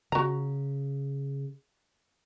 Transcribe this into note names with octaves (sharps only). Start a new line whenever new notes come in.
C#3 F#4 A#5